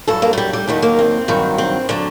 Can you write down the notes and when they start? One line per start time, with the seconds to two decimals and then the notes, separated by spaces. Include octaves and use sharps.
0.08 G2 F#3 A4
0.22 A#3
0.33 A3
0.38 G3
0.53 G3
0.68 D#2 D#3 F#3 G3
0.82 A#3
0.99 C4
1.28 G2 D#3 F#3
1.58 C4
1.89 D3 F#3 D4